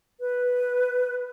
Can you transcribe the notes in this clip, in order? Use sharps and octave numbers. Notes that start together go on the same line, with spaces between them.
B4